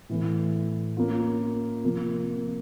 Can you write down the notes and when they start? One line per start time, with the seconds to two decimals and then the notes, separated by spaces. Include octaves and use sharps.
0.09 A2 E3 A3
0.97 A#3 C#4 F4
1.84 C3 F3 A#3